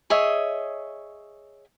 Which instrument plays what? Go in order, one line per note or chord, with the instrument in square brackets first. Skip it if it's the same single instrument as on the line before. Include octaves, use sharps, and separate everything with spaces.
[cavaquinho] G#4 C#5 D#5 E5